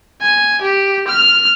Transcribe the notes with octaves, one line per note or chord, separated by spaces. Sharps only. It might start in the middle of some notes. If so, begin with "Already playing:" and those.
G#5
G4
F6